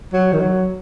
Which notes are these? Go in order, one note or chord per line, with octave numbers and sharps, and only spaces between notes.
F#3
D#3
F#3